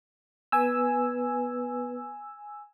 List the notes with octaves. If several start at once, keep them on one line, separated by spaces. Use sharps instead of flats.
B3 B4 G#5 E6